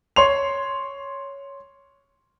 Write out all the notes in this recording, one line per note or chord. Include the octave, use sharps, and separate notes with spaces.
C#5 C6 F7